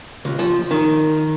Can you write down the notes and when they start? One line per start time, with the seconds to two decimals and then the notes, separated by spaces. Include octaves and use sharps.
0.25 C#2
0.39 F3
0.71 D#3